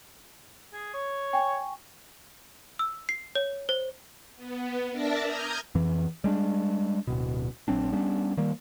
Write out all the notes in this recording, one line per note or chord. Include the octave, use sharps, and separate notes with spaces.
G#4
C#5
G5 G#5 C#6
E6
C7
C#5
C5
B3
D4 A#4 D5 E5 A5 A#5
A#5 D#6 F6 G6 G#6
F2 E3
G3 G#3 D4
D1 B2
A#1 F#3 C4 D4
G3 B3 C#4 D4
D#3 G3 A#3